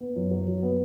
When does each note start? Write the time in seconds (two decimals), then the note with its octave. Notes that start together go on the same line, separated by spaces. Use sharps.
0.01 B3
0.16 F#2
0.31 F#3
0.47 F#2
0.63 B3